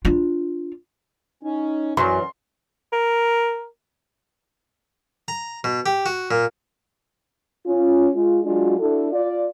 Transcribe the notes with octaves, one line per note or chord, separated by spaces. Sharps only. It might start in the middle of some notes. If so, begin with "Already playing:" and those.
D4 F4
C#4 D#4
F#2 E3 F#3 C6
A#4
A#5
B2
G4
F#4
A#2
C#4 F4
G#3 F4
F#3 G#3 D4 F4 F#4
D4 E4 F#4 A4
F4 D5